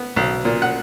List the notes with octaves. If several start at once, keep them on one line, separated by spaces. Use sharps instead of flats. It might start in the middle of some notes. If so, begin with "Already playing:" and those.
Already playing: B3
B1
A#2
F#5